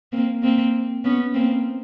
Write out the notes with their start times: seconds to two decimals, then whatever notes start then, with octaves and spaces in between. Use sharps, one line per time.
0.12 A#3 C4
0.43 A#3 C4
1.04 B3 C#4
1.34 A#3 C4